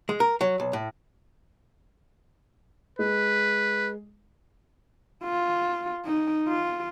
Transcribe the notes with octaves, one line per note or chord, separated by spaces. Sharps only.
G#3
A#4
F#3
B1
A2
G#3 B4
F4
D#4
F4